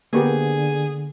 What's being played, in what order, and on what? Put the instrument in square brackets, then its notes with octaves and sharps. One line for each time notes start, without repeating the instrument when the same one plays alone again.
[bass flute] D3 [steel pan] A#3 B3 G4 [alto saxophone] G#4